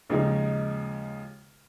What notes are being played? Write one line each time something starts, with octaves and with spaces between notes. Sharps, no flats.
D#2 C#3 F3 G#3 D#4